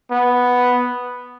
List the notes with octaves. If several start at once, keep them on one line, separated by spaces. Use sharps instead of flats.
B3